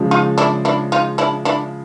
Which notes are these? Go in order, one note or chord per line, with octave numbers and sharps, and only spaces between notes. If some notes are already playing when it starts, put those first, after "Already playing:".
Already playing: C#3 F3 G#3
D#4 F4
D4 E4
D4 E4
D#4 F4
D4 E4
D4 E4